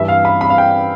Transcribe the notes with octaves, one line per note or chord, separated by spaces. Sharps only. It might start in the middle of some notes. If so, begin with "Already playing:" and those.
Already playing: G2 E3 E5
F5
B5
B5
F5
G5